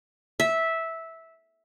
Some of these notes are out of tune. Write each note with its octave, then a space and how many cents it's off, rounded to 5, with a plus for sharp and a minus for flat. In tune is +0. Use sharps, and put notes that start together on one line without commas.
E5 -10